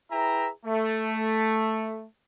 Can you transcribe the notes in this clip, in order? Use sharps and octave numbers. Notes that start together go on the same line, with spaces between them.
E4 G#4 B4 E5 G5 A#5
A3